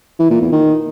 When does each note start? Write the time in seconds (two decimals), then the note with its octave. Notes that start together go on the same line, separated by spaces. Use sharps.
0.19 E3
0.30 A#2
0.41 E2
0.52 D#3